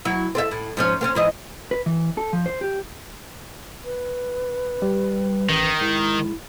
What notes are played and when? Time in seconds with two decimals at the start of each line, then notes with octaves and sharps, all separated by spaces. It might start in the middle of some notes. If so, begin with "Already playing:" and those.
0.05 F#3 E4
0.35 C4 A4 E5
0.51 A2
0.77 G#2 F3 C#4
1.01 A#3 C4 C#4
1.15 G#2 E3 D#5
1.71 B4
1.86 E3
2.17 A4
2.33 F3
2.46 C5
2.61 G4
3.85 B4
4.82 G3
5.49 A1 D#3
5.81 G#2 E4